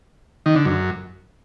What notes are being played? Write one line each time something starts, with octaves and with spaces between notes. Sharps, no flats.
D#3
D3
F#2